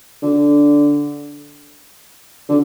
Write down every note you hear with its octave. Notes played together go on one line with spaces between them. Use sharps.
D3
D3